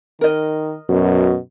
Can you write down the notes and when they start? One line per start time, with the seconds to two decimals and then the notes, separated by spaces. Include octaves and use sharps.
0.21 D#3 A#4 D#5
0.89 F#2 B2